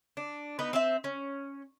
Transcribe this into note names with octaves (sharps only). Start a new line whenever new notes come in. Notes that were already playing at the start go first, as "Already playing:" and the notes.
D4
B3 D#4 B4
C4 C5 E5
C#4